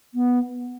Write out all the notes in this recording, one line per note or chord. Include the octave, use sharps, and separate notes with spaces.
B3